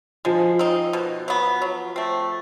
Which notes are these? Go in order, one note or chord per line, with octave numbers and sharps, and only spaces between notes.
F3 G#3
C4 D#4
B2
F#3 B3
F#3
A3 C4